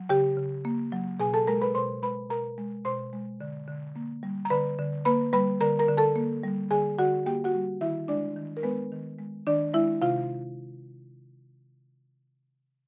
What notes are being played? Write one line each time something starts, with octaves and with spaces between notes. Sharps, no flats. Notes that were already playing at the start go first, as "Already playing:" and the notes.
Already playing: F#3
C#3 G4 G5
C#3
A#3
F#3
B2 G#4 G#5
A4 A5
G#3 A#4 A#5
B4 B5
B2 C5 C6
G#3 B4 B5
B2 A#4 A#5
G#3
B2 C5 C6
G#3
D3
D3
A#3
G3
A#5
D3 B4 B5
D3
A#3 B4 B5
G3 B4 B5
D3 A#4 A#5
A#4 A#5
D3
A4 A5
A#3
G3
D3 G#4 G#5
D3 F#4 F#5
A#3 G4 G5
F#4 F#5
G3
D#3 E4 E5
G#3 D4 D5
D#3
A#4
G#3 B3 B4
D#3
G#3
D#3 D4 D5
G#3 E4 E5
C3 F4 F5